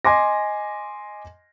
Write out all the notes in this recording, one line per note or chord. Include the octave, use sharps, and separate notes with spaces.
D#5 G#5 C6 D6 A#6